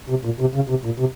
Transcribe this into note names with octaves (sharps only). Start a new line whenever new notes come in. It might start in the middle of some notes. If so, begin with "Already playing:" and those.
C3
A#2
C3
C#3
C3
A#2
C3